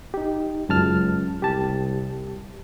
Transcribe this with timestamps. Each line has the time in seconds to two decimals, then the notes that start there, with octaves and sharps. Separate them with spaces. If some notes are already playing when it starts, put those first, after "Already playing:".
0.14 D#4 G4
0.69 C#2 F#2 A5 F6
1.42 C2 G4 A5